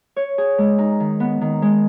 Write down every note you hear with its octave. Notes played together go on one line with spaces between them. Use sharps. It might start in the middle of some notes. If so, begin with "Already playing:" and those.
C#5
G#4
G#3
D#4
D#3
B3
D#3
G#3